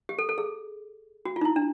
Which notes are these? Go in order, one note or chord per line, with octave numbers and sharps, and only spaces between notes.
G4
A4
A4
G#4
F#4
F4
D#4
E4
D4